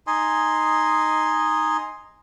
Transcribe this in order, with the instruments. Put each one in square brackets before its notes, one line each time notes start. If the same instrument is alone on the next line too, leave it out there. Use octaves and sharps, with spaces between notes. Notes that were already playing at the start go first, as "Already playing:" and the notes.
[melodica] D#4 D#5 G#5 C6